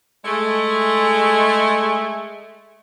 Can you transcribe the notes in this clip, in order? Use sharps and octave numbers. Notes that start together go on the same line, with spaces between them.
G#3 A3